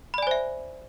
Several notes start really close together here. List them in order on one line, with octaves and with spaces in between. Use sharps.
B5 D5 G#5 C5 E5